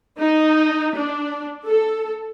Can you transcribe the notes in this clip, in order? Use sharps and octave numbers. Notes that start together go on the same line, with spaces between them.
D#4
D4
A4